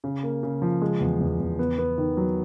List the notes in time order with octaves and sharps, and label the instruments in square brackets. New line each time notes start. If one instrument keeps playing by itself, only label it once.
[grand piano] C#3
A#3
C#3
F3
G#3
E2
E2
E2
B3
B3
D#3
F#3